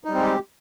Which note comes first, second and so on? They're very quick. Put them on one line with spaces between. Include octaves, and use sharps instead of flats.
D#4 G3 C4 G#3 G4